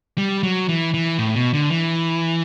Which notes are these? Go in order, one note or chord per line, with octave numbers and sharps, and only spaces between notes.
G3
F#3
E3
E3
A2
B2
D3
E3